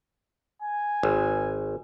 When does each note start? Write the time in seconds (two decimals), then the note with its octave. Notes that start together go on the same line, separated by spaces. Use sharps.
0.62 G#5
1.03 G#1